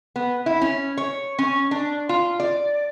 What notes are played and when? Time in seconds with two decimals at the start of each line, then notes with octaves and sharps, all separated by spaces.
0.16 B3
0.46 E4
0.62 C#4
0.97 C#5
1.39 C#4
1.71 D4
2.09 F4
2.40 D5